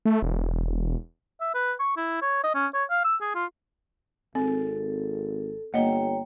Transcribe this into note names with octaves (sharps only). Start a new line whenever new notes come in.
A3
E1
E5
B4
C#6
E4
C#5
D#5
C#4
C#5
F5
E6
G#4
F4
G#1 C4 A4
G1 A#3 C#5 D#5 G5 A#5